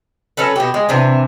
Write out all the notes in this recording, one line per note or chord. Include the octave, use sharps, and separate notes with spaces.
F#3 C#4 A4 B4
B2 G4
G#3
C3 E3 D4